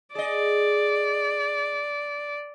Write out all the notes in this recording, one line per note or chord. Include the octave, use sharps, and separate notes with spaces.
G#4 D5 D#5